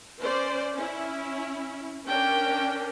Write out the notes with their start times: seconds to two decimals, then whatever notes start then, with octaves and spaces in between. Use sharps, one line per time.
0.19 C#4 C5 D5
0.75 C#4 E4
2.08 C#4 D4 A#4 G5